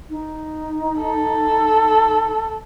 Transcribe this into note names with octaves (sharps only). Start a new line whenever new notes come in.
D#4
A4